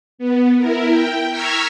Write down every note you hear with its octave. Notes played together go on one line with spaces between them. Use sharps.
B3
E4 A#4
G5
A#5 C#6 E6 F6 G#6 B6